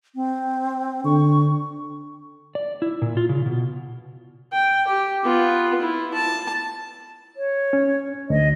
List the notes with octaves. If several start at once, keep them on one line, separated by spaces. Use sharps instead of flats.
C4
D3 C#6
D5
E4
A#2
F4
C#3
B2
G5
G4
B3 F4
E4
A5
C#5
C#4
D2 D#5